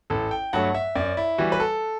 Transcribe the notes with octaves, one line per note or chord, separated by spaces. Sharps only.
A1 A4
G5
G2 F#3 A3 F#5
E5
F#2 D5
E4
E3 G3 F#4
B4
A4